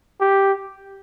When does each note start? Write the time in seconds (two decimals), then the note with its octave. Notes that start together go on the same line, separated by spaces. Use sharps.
0.21 G4